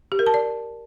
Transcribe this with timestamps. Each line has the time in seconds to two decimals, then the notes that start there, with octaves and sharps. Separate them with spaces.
0.12 G4
0.19 A#4
0.26 A5
0.34 D5